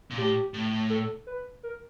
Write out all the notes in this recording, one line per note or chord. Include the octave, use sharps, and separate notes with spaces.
A#2
A2 G4
A2
A4
B4
A#4